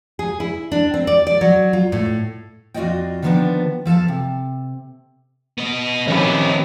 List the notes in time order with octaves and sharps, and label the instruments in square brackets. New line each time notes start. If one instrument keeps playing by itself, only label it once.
[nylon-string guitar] G#4
E4
D4
C4
D5
D5
F#3
F4
A2
[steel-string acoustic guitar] F2 F4 F#4 D5 D#5 G5
D3 D#3 F3 A#3 B3 D4
F3 A4 F5 A5
C3
[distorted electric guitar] B3 D#5
[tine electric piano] D#3 F3 B5 [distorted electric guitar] C4 B4 [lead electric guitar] C#4 G4